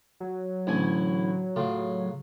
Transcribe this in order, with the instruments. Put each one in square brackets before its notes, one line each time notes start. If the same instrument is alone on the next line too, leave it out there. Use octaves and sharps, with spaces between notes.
[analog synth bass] F#3
[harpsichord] A1 D2 G#5 [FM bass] E4
[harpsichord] A2 F4 [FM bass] C#3